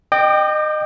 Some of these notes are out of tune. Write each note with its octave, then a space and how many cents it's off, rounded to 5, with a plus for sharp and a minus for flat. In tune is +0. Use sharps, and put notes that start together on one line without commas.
D#5 -25 G5 +0 D6 +35